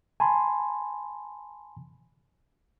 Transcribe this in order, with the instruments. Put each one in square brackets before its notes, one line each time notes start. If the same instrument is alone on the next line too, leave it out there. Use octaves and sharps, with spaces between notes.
[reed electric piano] G#5 A5 B5 C6